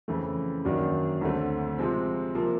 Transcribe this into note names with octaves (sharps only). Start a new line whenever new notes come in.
F2 C#3 E3 A3
F#2 D#3 F#3 A#3 D4
D2 D3 F#3 A3 C4
C3 F3 G#3 C4
C3 F3 A#3